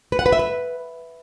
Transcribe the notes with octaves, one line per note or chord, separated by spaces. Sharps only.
B4
F#5
B4
E5
B4